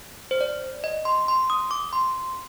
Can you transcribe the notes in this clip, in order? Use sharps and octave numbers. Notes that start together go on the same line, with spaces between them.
C5
D5
D#5
C6
C6
D#6
D6
C6